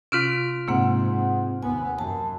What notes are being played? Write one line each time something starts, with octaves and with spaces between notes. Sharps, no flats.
C3 C#4 F4 F6 D7
G#2 C3 A#3 C4 F#5
D#2 B3 G#5
F#2 A5